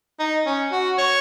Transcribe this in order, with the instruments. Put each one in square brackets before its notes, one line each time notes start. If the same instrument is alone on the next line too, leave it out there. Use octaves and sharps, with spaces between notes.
[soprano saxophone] D#4
C#4
F#4
C#5